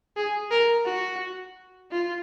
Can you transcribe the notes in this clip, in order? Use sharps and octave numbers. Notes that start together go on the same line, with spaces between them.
G#4
A#4
F#4
F4